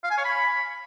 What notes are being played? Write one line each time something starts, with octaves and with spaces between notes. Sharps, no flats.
F5
G#5
C#5
B5